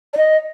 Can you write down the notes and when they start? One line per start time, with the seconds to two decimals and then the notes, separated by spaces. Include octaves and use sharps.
0.14 D5
0.17 D#5